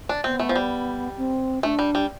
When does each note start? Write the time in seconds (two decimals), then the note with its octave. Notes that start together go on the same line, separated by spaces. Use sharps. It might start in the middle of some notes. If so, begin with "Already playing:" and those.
0.09 D4
0.24 B3 C4
0.40 A3
0.49 F3
0.55 G3
1.17 C4
1.63 A3 D4
1.79 G3
1.95 G3